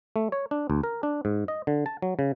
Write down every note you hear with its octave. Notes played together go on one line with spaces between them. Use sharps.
A3
C#5
D4
D2
A#4
D4
G#2
D#5
D3
A5
F#3
C#3